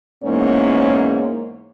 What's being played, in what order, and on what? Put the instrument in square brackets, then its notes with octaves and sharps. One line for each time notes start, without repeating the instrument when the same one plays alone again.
[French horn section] E2 G#2 A#3 C#4 C#5